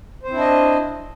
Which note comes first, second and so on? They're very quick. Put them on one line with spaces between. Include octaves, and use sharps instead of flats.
C5 C4 E4 D4 D#5